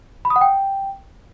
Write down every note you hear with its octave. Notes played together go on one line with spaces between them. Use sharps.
B5
D#6
F#5
G5